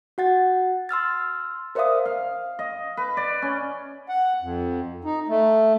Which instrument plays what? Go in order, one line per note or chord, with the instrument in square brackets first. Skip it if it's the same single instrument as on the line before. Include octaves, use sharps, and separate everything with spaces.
[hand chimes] F#4 F#5 A6
C6 E6 F6 A6
A#4 C5 D5 E5 F5 D#6
[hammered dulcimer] F5
D#5
B4
D5
C#4
[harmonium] F#5
F2
D#4
A3